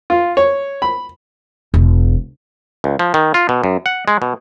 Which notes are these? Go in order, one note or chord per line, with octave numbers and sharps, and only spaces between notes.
F4
C#5
B5
E1
C#2
F3
D#3
F4
B2
F#2
F#5
G#3
B2